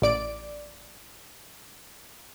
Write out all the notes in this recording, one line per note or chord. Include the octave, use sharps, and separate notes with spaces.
A1 D5 D7